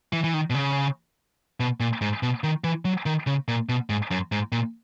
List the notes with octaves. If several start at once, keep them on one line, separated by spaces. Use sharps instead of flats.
E3
E3
D#3
B2
C#3
B2
A#2
G#2
B2
D#3
E3
F#3
D#3
C#3
A#2
B2
G#2
F#2
G#2
A#2